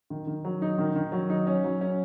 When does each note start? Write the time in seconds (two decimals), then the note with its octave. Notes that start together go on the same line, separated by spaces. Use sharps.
0.10 D#3
0.27 D#3
0.45 F#3
0.62 D#4
0.78 D#3
0.96 D#3
1.12 F#3
1.30 D#4
1.47 C#4
1.64 F#3
1.81 C#4